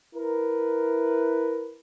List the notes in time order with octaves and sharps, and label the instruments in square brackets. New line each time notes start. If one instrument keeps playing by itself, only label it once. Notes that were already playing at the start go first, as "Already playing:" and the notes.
[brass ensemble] E4 A#4 B4